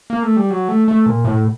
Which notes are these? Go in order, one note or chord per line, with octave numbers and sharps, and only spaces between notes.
A#3
A3
G3
F#3
A3
A3
A#2
A2